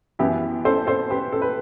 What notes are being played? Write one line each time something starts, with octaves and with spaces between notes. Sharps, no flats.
F#2 E3 B3 E4 G4
A4 C5
A4 C5
G4 B4
A4
B4